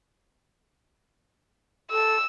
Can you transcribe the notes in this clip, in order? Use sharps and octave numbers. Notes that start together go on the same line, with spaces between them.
A4 E6